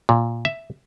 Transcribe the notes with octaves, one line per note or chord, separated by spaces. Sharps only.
A#2
E5